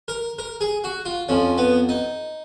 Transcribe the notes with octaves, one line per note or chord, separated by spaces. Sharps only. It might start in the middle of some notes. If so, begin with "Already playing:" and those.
A#4
A#4
G#4
F#4
F4
F2 F3 C#4
B3
D#4